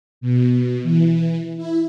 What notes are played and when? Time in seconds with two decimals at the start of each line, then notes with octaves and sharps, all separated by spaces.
0.21 B2
0.83 E3
1.57 E4